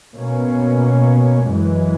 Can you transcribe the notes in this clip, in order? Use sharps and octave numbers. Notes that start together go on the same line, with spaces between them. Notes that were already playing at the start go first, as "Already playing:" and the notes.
B2 A#3 C#4
F#2 E3 G#3